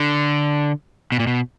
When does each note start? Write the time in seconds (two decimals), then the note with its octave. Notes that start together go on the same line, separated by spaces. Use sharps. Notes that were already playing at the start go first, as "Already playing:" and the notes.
Already playing: D3
1.12 B2
1.20 A#2
1.27 B2